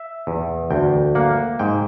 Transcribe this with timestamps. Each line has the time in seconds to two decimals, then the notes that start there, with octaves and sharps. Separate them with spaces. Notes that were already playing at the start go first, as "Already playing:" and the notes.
Already playing: E5
0.27 E2
0.71 D2 G5
1.15 A#3 F#5
1.59 G#2 G5